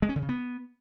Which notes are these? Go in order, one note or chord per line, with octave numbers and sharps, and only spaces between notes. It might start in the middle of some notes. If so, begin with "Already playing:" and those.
G#3
C#4
D3
C#3
B3